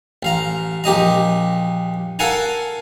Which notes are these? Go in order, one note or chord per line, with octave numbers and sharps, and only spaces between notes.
A1 F5 A#5
A#1 G4 D#5 A#5
A4 A#4 F5 F#5 G#5 A#5